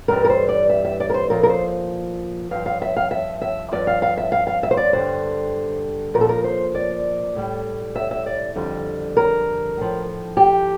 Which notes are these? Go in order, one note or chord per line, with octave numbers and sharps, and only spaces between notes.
G2 E3 G3 A#4
A#4
C5
D5
E5
E5
D5
A#4
C5
A#2 F3 A#4
A#4
C5
G2 F3 F5
F5
E5
F5
E5
E5
G2 F3 D5
F5
F5
E5
F5
F5
E5
C5
D5
G2 D3 G3 C5
A#2 F3 A#4
A4
A#4
C5
D5
A2 G3
E5
E5
D5
F2 D3 G3
A#4
A2 F3
G4